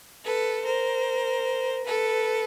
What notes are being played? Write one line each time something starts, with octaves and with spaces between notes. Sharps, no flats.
A4 B4
A#4 C5
A4 B4